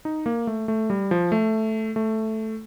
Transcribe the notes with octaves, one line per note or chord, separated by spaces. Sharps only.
D#4
A#3
A3
A3
G3
F3
A3
A3